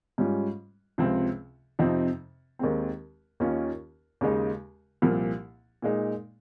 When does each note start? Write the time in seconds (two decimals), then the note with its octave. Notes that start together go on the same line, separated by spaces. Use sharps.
0.18 G#2 G3 C#4 F4
0.98 C#2 C3 F3 C4
1.79 F2 C3 F3 C4 D#4
2.59 D#2 D#3 G#3 C4
3.40 D#2 D#3 A#3 C#4 F4
4.21 D#2 C#3 G#3 D#4
5.02 C2 A#2 F3
5.82 A#2 G#3 D#4